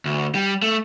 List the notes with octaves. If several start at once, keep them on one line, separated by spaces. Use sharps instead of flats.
D2
G3
A3